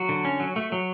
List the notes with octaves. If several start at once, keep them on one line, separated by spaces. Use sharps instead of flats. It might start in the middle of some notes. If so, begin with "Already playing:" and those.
Already playing: F#3 F#4
D3
C#4
F#3
A3
F#3